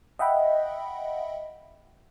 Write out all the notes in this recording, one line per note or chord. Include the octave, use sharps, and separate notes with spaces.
D#5 E5 F#5 G5 B5